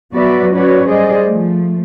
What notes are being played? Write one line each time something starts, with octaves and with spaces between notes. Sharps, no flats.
F#3 B3 F#4 B4 D5 E5
C#4 F#4 B4 C#5 D5
G3 G#4 C5 D5 D#5
F3 A3